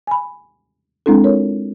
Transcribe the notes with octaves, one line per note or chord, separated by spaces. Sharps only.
G#5 B5
G#3 C4 D4 E4 A4
C4 F4 A#4 C#5